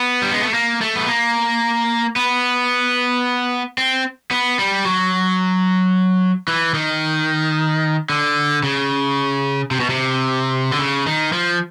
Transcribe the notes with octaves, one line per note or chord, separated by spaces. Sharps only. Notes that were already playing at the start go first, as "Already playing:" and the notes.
Already playing: B3
G3
G#3
A3
A#3
A3
B3
A#3
B3
C4
B3
G3
F#3
E3
D#3
D3
C#3
C3
B2
C3
D3
C#3
D#3
F3